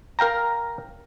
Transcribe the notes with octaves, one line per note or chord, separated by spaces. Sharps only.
A#4 F5 G5 A#5